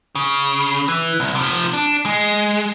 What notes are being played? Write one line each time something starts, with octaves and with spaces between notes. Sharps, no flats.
C#3
E3
C2
C3 F3
D4
G#3